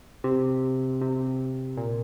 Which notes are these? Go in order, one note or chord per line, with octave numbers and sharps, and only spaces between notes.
C3
C3
A#2